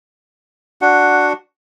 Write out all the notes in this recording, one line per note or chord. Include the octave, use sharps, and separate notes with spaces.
D4 F#4 F#5